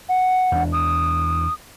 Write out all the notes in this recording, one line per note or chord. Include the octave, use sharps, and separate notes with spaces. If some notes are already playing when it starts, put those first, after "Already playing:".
F#5
E2 D4
D#6